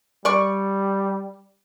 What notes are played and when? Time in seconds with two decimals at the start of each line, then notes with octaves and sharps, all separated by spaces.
0.25 G3 D5 C#6